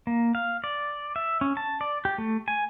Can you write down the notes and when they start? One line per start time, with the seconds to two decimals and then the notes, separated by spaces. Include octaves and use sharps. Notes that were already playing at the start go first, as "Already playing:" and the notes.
0.07 A#3
0.35 F5
0.64 D5
1.16 E5
1.41 C#4
1.57 A5
1.81 D5
2.05 G4
2.18 A3
2.48 G#5